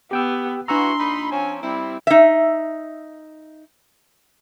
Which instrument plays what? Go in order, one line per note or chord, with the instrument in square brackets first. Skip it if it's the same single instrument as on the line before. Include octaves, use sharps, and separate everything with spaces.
[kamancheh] B3 [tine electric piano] G4 G5 E6
[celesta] D4 E6 [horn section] E4 F#4 B4 [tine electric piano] A#5 [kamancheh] C6
[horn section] A#2 D#4 B5
[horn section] F3 C4 C#4 [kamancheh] G#5
[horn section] G3 E4 [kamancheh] C4
[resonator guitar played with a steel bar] D#4 E5